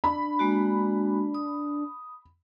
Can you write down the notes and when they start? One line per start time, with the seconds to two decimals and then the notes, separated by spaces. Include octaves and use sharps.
0.04 D4 B5
0.39 G#3 A#3 F#4
1.34 D#6